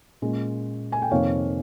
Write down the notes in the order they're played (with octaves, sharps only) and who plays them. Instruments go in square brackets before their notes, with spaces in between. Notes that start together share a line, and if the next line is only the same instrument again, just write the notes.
[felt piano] A#2 G#3 C#4
G#5
G5
F2 C3 D#3 A#3 C#5 F5